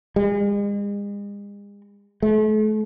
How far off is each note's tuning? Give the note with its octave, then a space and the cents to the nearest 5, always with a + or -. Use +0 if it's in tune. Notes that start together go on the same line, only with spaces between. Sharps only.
G#3 -40
A3 -40